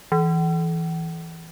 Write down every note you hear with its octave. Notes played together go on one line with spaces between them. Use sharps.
E3